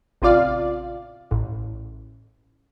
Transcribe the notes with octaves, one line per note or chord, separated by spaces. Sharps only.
A1 C3 F4 D5 F5
A1